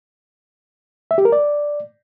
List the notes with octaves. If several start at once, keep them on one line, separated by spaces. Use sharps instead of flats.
E5
G4
A#4
D5